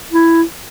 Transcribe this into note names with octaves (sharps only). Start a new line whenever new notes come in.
E4